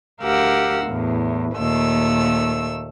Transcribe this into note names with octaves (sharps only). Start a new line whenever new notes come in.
D2 G4 A#4 F5 F#5 E6
E2 A2
D#2 A#2 A3 E6